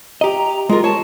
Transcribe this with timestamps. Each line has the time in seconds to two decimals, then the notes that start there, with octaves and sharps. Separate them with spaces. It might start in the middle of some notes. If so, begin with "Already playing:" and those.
0.21 G4 D#5 A#5
0.69 G#3 F4 A#4
0.84 C#5 A5